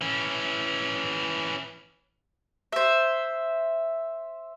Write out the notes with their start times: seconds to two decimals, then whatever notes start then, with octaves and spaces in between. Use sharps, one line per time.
0.01 E3 C#4
2.72 C5 E5